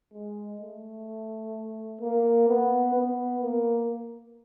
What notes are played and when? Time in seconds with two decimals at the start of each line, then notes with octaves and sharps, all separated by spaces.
0.13 G#3
0.61 A3
2.01 A#3
2.48 B3
2.94 B3
3.41 A#3